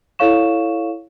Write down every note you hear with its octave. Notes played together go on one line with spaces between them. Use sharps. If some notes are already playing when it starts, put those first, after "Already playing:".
E4 A4 C#5 F5 C#6 E7